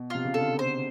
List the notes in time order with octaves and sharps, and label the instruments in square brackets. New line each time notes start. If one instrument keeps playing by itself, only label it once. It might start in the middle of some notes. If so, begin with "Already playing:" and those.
Already playing: [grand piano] B2
[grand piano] C3 [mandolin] F4
[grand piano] C#3
[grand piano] D3 [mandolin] A4
[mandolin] C5